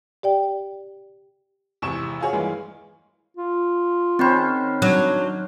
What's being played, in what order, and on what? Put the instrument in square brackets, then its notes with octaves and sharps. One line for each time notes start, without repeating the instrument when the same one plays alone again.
[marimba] G4 D5 G5
[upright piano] G#1 E2 C3 C#6 E7
F4 F#4 G#4 C#5 F5
G2 E3 G#3 A#3
[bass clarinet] F4
[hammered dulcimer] D#3 C#4 C5 [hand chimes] C4 B5
[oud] F#3 [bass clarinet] D4